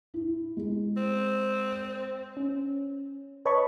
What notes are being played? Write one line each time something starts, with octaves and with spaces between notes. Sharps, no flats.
E4
G#3
C4
C#4
B4 C#5 D#5 A5 B5 C#6